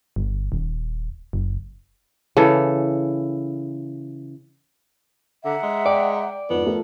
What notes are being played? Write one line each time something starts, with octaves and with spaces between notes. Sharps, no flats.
G1
D#1
F#1
C#3 E3 A4
D3 E5 F#5 A#5
G#3
D5 G5
F2 G#2 B3
F3 A3 A#4